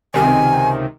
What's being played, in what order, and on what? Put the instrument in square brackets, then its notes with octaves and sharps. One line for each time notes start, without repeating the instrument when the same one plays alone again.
[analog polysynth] C#2 C3 D#3 [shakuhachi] G#5